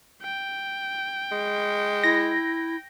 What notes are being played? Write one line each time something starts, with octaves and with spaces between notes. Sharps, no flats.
G5
G#3
E4 A#6